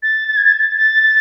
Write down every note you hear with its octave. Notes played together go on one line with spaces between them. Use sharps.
A6
A6
G#6
A6
A6
A6